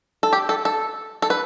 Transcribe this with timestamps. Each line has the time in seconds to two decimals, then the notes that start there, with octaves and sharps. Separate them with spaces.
0.23 A4
0.33 G4
0.49 A4
0.65 A4
1.22 A4
1.30 B4